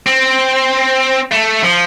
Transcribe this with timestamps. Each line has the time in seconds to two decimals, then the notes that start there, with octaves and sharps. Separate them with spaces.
0.06 C4
1.32 A3
1.63 F3